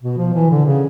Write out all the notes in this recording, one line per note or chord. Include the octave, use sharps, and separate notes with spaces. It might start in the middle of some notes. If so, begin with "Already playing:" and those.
B2
F3
E3
D3
C#3